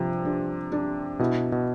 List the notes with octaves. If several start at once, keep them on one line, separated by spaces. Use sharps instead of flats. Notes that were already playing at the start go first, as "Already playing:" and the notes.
Already playing: G2 C3 F3
D4
D4
B2 E4
B2